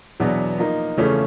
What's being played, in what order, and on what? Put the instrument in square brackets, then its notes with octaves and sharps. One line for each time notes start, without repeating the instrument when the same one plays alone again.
[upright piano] E2 B2 F#3 B3 D4
F3 A#3 D#4
E2 C#3 F3 A3 C#4